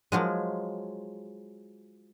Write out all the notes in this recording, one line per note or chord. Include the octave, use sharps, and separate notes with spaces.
F3 F#3 G#3